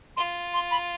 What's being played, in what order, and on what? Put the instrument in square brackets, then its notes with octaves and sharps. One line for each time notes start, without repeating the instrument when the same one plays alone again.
[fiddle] F4 [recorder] C6
[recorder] C6
B5